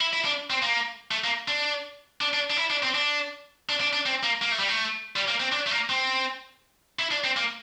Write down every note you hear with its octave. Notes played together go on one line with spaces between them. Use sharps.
E4
E4
D4
C4
A#3
A3
A#3
D4
D4
D4
D4
E4
D4
C4
D4
D4
D4
D4
C4
A#3
A#3
A3
G3
A3
G3
A#3
C4
D4
A3
A#3
C4
E4
D4
C4
A#3